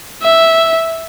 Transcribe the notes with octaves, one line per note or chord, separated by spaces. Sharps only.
E5